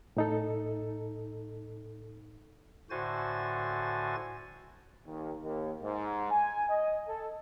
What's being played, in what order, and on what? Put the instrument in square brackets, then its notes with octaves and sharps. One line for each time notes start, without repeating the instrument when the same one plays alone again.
[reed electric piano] A2 D#4 A4
[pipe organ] A2 D3 F#4 C5 G#5 A6
[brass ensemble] D#2
D#2
G#2
G#5
D#5
A4